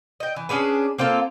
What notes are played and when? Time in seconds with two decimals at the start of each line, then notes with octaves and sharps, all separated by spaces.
0.20 D#5 G5
0.36 E3
0.49 C#4 D4 G#4 B4
0.98 A#3 C4 F4 A4